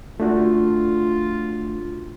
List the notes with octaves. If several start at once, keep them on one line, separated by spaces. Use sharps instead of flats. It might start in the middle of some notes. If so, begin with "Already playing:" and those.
A3 D4 F4 F#4